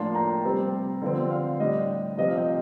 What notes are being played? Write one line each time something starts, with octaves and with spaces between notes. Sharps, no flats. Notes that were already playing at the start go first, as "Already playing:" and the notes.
Already playing: A2 F3 A#3 D4 A5 C6
G5 A#5
C3 G3 C4
D3 F3 C4
F5
A2 G3 D4 D#5
C3 F3 C4 D#5
F5
D#5 G5